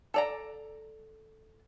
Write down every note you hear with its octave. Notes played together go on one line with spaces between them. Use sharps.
A4 D5 A#5